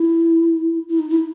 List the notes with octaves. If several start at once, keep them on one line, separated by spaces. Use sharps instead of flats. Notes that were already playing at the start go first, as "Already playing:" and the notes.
Already playing: E4
E4
D#4
E4